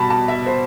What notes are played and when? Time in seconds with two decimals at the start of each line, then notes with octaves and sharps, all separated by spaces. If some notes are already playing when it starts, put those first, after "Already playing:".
Already playing: B2 G3 A5 B5
0.10 A5
0.28 E5
0.46 C5